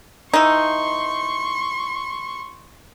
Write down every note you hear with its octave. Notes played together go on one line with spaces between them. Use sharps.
E3 D#4 C6 C#6